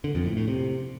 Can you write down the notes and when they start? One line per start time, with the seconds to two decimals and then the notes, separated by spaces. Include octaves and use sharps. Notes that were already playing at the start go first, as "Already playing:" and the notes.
0.04 D3
0.15 F2
0.26 A2
0.37 A2
0.48 C3